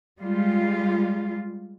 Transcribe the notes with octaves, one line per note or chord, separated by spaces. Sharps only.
G3 G#3 F4